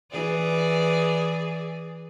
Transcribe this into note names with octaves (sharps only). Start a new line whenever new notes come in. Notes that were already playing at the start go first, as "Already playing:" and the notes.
E3 G#4 D5